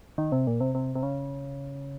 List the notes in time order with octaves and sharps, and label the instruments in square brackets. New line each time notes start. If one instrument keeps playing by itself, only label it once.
[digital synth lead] D#3
C3
A#2
C3
C3
C3
C#3